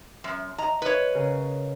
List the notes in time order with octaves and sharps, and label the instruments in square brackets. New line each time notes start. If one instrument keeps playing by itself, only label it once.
[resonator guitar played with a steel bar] F#2
[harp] D#5 [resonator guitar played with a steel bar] A#5
[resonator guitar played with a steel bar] B4 C#5
[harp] C#3 A#4